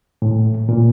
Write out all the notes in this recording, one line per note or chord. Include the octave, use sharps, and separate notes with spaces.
A2
A#2